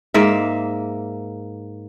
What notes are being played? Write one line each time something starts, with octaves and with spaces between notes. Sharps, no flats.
G#2 A#3 E5